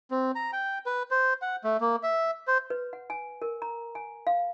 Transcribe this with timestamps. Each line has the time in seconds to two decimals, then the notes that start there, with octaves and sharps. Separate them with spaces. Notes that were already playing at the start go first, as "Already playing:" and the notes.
0.11 C4
0.35 A#5
0.53 G5
0.86 B4
1.11 C5
1.42 F#5
1.64 A3
1.81 A#3
2.03 E5
2.47 C5
2.70 B4
2.93 F#5
3.10 G#5
3.42 A#4
3.62 A#5
3.95 G#5
4.27 F5